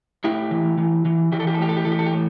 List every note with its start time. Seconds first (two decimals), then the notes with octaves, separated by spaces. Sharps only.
0.24 A2 E4 G4
0.51 E3
0.78 E3
1.05 E3
1.32 E3 G4
1.40 A4
1.47 G4
1.54 A4
1.59 A2 G4
1.69 A4
1.77 G4
1.85 E3 A4
1.92 G4
1.99 A4
2.06 G4
2.13 A2